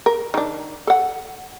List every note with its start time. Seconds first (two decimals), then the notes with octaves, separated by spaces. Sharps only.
0.06 A#4
0.34 D#3 D4
0.87 A4 F#5